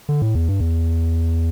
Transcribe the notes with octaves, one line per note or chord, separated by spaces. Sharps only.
D3
A2
E2
G2
E2